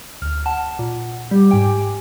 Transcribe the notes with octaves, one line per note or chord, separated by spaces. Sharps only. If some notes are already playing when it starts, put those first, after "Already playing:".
D2 F6
F#5 A5
A#2
G3 G4
G#2 G5 G#5